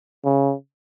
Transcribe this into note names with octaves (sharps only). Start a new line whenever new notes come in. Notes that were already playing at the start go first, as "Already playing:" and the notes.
C#3